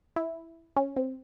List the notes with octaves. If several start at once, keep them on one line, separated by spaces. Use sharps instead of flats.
E4
C#4
C4